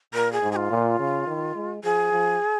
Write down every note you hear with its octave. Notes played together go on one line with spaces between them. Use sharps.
A#2 A#4
G#4
G#2
G#4
F4
A#2
C#3
D#3
G#3
F3 G#4
F3